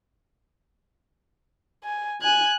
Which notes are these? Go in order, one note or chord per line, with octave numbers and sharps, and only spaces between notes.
G#5
G#5 F#6 G#6